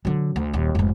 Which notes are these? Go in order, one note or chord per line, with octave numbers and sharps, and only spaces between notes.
D3 F#3
D2
D#1 D#2
F1 G#2